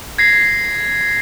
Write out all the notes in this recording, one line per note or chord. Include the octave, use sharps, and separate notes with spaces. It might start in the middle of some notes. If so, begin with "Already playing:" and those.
G#6 A#6 C7